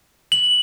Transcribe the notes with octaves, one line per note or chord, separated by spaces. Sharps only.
F#7